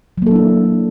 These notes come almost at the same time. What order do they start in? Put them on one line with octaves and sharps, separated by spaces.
F#3 A#3 A4 D4 E4